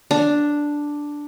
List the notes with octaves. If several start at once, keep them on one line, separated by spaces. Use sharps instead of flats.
D4